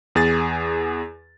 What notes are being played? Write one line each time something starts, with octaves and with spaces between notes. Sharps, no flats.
E2 G#4 A6